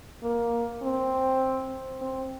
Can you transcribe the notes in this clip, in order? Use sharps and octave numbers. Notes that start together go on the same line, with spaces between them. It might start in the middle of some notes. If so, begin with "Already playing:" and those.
A#3
C4
C4